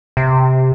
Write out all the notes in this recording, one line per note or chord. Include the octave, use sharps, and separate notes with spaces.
C3